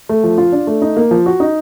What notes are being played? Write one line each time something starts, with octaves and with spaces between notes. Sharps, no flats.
A3
F3
F4
D4
A3
D#4
A#3
F3
F#4
D#4